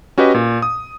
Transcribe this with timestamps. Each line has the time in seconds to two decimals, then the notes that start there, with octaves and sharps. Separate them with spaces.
0.18 C#4 F#4 G4 B4 D#5
0.34 A#2
0.62 D#6